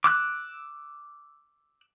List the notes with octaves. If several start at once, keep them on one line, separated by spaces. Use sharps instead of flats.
D6 E6 F#6